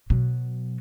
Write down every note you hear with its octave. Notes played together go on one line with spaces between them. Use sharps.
B2 F#3